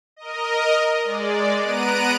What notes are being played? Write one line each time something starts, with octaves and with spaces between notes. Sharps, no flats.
A#4 D#5
G#3 D5
B3 A#5 F#6 D7 D#7